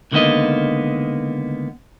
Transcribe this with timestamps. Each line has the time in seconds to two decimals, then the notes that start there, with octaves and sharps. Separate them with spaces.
0.12 C#2 D3 D#3 A#3 B3 D#5